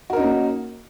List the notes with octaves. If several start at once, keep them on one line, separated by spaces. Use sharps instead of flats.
A#3 C#4 D#4 F#4 A#4